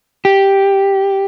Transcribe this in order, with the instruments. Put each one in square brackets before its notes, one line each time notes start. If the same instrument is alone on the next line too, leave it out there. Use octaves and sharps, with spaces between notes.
[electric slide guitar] G4